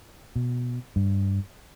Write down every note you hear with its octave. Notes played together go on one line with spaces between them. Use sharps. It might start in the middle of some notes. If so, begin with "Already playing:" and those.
B2
G2